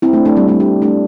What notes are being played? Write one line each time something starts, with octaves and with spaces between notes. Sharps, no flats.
C4 E4
A3 D4
A3 D4
G3 C4
A3 D4
D4 G4
A3 D4